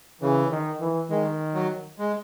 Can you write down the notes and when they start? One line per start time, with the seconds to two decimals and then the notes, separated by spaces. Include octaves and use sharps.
0.21 C#3 E3
0.51 D#3
0.80 E3
1.10 D#3 G#3
1.54 F#3
1.99 G#3